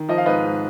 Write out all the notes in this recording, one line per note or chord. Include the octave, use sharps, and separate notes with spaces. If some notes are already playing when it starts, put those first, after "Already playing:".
Already playing: D#3
F3 D#5
F5
G#2 B4 D#5
G#2